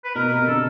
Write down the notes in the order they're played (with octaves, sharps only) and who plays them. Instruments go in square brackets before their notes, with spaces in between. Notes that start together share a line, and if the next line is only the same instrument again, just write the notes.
[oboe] B4
[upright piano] B2 [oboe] A#4
[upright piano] C3 [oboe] A#4
[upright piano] D3 [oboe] A4